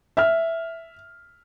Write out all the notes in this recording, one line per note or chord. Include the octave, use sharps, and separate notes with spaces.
E5 F6